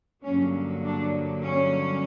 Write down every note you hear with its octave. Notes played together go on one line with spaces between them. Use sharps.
G2 D3 F#3 A#3 C#4
D4
C#4